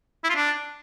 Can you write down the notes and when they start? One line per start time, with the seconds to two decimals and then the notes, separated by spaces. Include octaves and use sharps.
0.24 E4
0.30 F4
0.35 D4